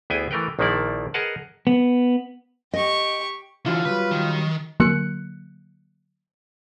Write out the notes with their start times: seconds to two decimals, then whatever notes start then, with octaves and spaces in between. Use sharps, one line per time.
0.10 D2 B3 E4 G#4 G5 G#5
0.31 E3 A3 A#4 B4 G5
0.59 A#1 D#3 F3 A#3 E4 D5
1.14 G#4 A#4 B4 D#5 F#5 A5
1.67 B3
2.74 G4 D#5 C#6
3.66 D3 E3 F#3 E4 F4
3.85 F#3 G3 B4
4.11 D#3
4.80 D3 F#3 A#3 F#6 C#7